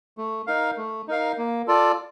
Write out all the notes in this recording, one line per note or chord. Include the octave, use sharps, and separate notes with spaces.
A3
D#4 A#4 F5
A3
D#4 A#4 F5
A#3
F4 A4 D5